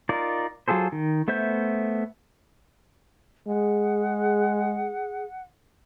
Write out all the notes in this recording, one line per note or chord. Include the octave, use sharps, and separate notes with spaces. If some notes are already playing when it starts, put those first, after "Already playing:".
D#4 F4 A#4 D5
F#3 F4 G#4 A4 C5
D#3
A3 B3 C5 E5 G6
G#3 G#4 F#5